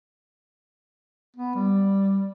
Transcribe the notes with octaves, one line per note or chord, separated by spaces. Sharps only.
B3
G3